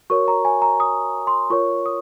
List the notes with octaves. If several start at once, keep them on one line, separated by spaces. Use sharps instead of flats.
F#4 A#4 C#5 C#6
A#5
G#5
A#5
D#6
C6
F4 A#4 C#5 C#6
D#6